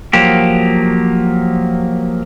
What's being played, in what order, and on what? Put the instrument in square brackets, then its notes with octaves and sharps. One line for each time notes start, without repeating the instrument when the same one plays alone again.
[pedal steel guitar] F3 F#3 A#3 G4